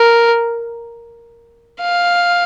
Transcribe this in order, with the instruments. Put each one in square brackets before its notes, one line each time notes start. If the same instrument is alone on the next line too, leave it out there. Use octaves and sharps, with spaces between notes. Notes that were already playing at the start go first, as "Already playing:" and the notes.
Already playing: [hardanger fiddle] A#4
F5